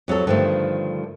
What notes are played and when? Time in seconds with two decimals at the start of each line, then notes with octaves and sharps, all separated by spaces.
0.08 F2 F#3 F4 A4
0.27 G2 D3 D#3 F3 G3 A3